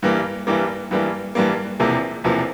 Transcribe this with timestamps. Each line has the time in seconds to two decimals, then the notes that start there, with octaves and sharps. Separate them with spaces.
0.02 G2 E3 G3 A#3
0.47 G2 E3 G3 A#3
0.91 G2 E3 G3 A#3
1.35 G2 E3 G3 A#3
1.80 E1 E2 C3 F3 A#3
2.24 E1 E2 C3 F3 A#3